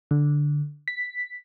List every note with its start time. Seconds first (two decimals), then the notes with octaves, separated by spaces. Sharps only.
0.11 D3
0.88 B6